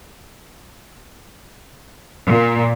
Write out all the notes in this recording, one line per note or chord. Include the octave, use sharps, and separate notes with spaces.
A#2